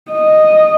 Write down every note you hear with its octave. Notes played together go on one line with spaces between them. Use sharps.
D#5